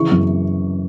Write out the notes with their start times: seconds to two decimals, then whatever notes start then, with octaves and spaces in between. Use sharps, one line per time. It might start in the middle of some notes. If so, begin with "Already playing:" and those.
Already playing: C#3 E3 C#6
0.12 F#2